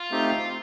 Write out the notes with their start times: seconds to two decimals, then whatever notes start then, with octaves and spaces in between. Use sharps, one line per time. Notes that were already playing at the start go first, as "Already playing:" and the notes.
Already playing: F4
0.11 A3 C4 D#4 G4